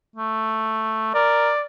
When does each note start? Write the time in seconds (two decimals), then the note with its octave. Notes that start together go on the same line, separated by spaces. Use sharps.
0.16 A3
1.15 A#4 D5